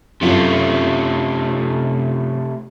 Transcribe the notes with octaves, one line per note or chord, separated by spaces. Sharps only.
F#2 C3 A3 F4 C#5